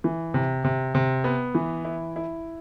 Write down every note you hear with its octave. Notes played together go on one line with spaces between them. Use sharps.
E3
C3
C3
C3
B3
E3
E4
E4